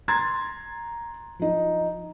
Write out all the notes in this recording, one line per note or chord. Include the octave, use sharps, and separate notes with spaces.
A#5 C6 G#6 A6
F3 D#4